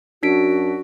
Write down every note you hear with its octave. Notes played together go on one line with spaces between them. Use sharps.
F#2 D4 F#4 B6 D7